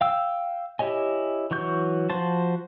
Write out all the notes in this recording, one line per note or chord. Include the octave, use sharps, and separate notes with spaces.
F5 G5 E6
E4 G4 C#5 D#5 G#5
E3 F#3 C#6 G6
F3 F#4 C5 A5